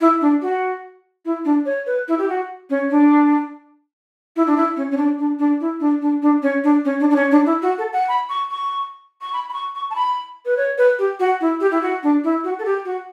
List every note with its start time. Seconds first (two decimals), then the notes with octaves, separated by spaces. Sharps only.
0.01 E4
0.21 D4
0.42 F#4
1.25 E4
1.45 D4
1.66 C#5
1.86 B4
2.08 E4
2.18 G4
2.29 F#4
2.70 C#4
2.91 D4
4.36 E4
4.47 D4
4.57 E4
4.76 C#4
4.91 C#4
4.97 D4
5.19 D4
5.39 D4
5.61 E4
5.80 D4
6.02 D4
6.22 D4
6.42 C#4
6.64 D4
6.85 C#4
7.00 D4
7.11 D4
7.16 C#4
7.31 D4
7.46 E4
7.62 F#4
7.78 A4
7.93 F#5
8.08 B5
8.29 C#6
8.51 C#6
9.21 C#6
9.33 B5
9.49 B5
9.53 C#6
9.75 C#6
9.90 A5
9.96 B5
10.46 B4
10.57 C#5
10.78 B4
10.99 G4
11.20 F#4
11.41 E4
11.61 G4
11.71 E4
11.82 F#4
12.03 D4
12.24 E4
12.44 F#4
12.59 A4
12.65 G4
12.85 F#4